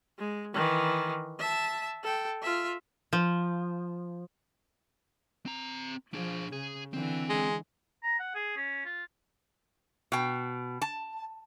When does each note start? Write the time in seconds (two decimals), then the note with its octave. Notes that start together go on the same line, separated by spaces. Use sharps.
0.18 G#3
0.54 D#3 E3
1.39 E5 A5
2.03 A4 G5
2.42 F4 E5
3.13 F3
5.46 C4 A#5
6.14 F3 D4 G#4
6.53 C#3 G#4
6.94 D3 E3 C4
7.29 G#3
8.03 A#5
8.19 F#5
8.35 G#4
8.57 C#4
8.85 F4
10.12 B2 G5
10.82 A5